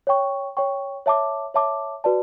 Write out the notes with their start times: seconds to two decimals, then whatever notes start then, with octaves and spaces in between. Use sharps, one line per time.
0.07 C#5 G5 C#6
0.57 C#5 G5 C#6
1.06 C#5 E5 A5 D6
1.54 C#5 E5 A5 D6
2.04 F#4 B4 D5 A5